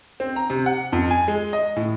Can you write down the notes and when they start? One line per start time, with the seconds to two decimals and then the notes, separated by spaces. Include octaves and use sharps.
0.20 C4
0.36 A#5
0.50 C3
0.66 F#5
0.92 F2
1.11 G#5
1.28 G#3
1.53 D#5
1.76 A2